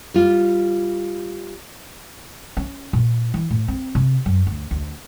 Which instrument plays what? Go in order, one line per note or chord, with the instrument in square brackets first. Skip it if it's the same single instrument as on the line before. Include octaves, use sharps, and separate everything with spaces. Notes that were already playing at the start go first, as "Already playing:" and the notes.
[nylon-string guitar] G3 F4
[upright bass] C#4
A#2
E3
A2
C4
C3
F#2
D2
D2